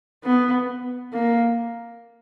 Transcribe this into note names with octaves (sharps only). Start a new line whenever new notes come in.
B3
A#3